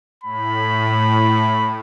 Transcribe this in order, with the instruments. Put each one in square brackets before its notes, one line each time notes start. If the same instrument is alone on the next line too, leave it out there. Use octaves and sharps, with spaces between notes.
[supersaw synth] A2 [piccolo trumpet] B5